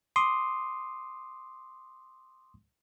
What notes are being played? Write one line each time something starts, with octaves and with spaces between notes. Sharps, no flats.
C6 D6 D#6